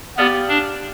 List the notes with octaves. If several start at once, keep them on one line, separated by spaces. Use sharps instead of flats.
B3 G4 A#4 D5 F5
D4